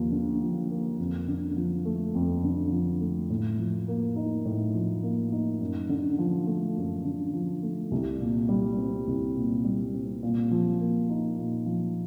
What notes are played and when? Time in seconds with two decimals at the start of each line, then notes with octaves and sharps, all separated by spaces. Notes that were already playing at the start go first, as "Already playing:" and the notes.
Already playing: D#2 F3 A#3
0.12 D3
0.41 F3
0.70 A#3
0.99 F2
1.28 D3
1.57 F3
1.85 A3
2.15 F2
2.44 D3
2.72 F3
3.01 A3
3.30 A2
3.58 F3
3.88 A#3
4.16 D#4
4.45 A2
4.74 F3
5.03 A#3
5.32 D#4
5.60 F#2
5.89 D3
6.18 F3
6.47 A3
6.76 F#2
7.05 D3
7.33 F3
7.63 A3
7.91 C2
8.20 A#2
8.49 G3
8.78 C4
9.07 C2
9.36 A#2
9.65 G3
9.94 C4
10.23 A#2
10.51 F3
10.81 A#3
11.09 D#4
11.38 A#2
11.66 F3